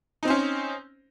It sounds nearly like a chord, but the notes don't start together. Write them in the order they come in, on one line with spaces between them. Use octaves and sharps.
D#4 C4 C5 C#4